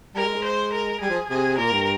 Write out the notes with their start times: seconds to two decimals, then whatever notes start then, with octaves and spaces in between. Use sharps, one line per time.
0.15 G3 A#4
0.24 G#3
0.35 G#3
0.44 C5
0.72 A#4
1.01 G3 G#4
1.10 F3
1.29 C3 G#4
1.58 A#2 A#4
1.71 G2